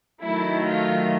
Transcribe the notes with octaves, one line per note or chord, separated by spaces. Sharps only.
D#3 F#3 A3 E4
F4